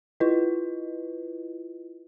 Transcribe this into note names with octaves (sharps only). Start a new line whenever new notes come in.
E4 F4 B4 D#5